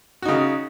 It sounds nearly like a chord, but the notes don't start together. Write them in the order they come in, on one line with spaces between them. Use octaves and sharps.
F#4 D#4 C#3